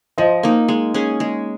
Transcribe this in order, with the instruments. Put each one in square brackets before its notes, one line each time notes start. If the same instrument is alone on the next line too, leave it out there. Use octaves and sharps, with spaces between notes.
[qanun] F3 [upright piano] C5 D#5
[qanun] A#3 D#4
G#3
C#4 G#4
G#3